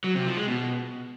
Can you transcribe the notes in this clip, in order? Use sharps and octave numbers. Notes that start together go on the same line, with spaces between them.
F#3
C3
F3
G#3
B2